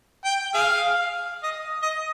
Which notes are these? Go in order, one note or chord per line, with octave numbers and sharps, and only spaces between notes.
G5
G#4 F5
D#5
D#5